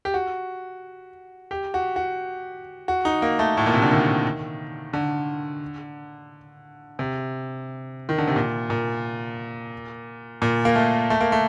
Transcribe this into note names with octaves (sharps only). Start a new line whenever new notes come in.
G4
F#4
G4
F#4
F#4
F#4
D#4
A#3
A3
A2
A#2
C3
D3
D#3
D3
C3
D#3
D3
C3
A#2
A#2
A#2
A#3
A3
A3
A#3
A3